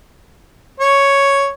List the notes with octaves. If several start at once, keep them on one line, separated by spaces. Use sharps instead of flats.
C#5